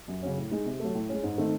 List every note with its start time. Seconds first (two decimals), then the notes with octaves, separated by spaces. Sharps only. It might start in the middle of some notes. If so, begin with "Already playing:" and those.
0.08 F#2
0.22 C#3 F#3 C#4
0.37 A2
0.51 G#3 D#4
0.66 C3
0.80 F#3 A3
0.95 A2
1.09 G#3 C#4
1.23 G#2
1.38 D#3 A3 C4 D#4